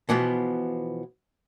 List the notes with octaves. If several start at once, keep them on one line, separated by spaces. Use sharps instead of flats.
B2 E3 F3 B3